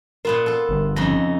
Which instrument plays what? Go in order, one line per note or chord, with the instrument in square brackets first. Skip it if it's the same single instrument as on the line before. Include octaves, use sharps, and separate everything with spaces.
[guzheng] A#2 B3 F4 [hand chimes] A#4
[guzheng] F4 A4
[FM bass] G1
[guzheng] F2 C#3 D#4 [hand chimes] A#6